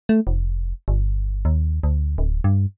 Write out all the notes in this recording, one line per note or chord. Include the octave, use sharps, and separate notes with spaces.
A3
F1
G1
D#2
D2
D1
G2